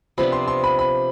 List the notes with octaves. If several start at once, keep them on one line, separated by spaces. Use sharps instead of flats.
C3 F3 B3 D4 B5
C6
C6
B5
B5